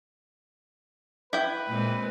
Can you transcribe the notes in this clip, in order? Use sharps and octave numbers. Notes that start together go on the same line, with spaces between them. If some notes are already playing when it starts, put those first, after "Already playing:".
E4 B4 G5
A#2 G#3 C4